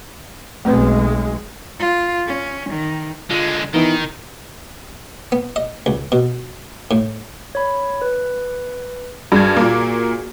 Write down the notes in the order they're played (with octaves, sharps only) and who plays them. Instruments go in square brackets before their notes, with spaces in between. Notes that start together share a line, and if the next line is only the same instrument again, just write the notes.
[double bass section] B1 G#3 [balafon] A3 C4 B4
[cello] F4
C#4
D#3
[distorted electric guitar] D3 G#3 [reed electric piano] F4
[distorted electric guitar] D#3 [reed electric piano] E3 B3 E4 [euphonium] D#4
[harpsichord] B3
D#5
C#2
B2
A2
[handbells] C#5 B5
B4
[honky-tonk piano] G2 G#6 [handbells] F#4 G#4 A#4
[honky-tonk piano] A#2 A#3